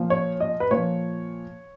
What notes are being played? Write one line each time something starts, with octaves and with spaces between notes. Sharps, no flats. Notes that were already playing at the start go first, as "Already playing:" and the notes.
Already playing: A#2 F3
C#5
D#5
B4
A#2 F3 C#5